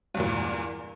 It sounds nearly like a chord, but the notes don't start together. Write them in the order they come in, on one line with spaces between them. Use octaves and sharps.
G2 E2 A#2